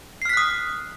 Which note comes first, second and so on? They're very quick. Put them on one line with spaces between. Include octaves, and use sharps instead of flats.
C7 F6 B6 F#6 D#6